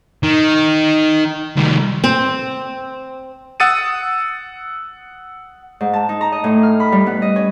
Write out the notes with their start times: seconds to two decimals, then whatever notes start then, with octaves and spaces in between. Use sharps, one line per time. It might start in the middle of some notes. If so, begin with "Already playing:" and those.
0.23 D#3
1.57 C2 D#3
2.04 C4
3.60 F#5 D#6 E6 A6 C#7 D#7
5.81 G#2
5.93 A5
6.09 D#4
6.21 A#5
6.32 D#5
6.44 A2
6.63 F6
6.80 B5
6.92 G3
7.06 B3
7.22 D#5
7.36 C#4